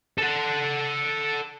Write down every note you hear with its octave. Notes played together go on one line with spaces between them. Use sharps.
A4 F#5